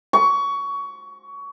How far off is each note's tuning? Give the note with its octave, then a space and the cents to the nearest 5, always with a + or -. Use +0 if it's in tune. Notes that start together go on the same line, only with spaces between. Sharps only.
C#6 +20